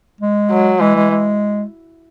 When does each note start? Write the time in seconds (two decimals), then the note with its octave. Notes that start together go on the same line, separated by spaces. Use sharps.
0.21 G#3
0.50 F#3
0.80 E3 G#3
0.96 G#3
1.10 G#3